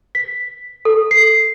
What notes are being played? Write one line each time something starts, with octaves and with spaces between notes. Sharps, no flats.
B6
A4
C7